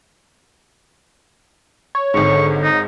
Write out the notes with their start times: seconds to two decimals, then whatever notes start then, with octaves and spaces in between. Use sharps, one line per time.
1.95 C#5
2.14 G#1 G#2 D3 C#6
2.64 D#4